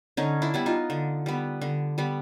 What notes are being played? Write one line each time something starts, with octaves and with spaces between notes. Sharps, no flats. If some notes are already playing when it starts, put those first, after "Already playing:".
D3 C#4 D#4
D4 E4
G3 B3 E4
D#4 F4
D3
G3 B3
D3
G3 B3